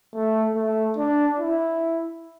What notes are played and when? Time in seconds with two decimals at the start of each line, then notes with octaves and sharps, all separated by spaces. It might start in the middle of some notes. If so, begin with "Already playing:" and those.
0.15 A3
0.55 A3
0.97 D4
1.39 E4